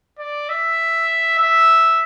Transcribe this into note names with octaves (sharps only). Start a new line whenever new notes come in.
D5
E5
E5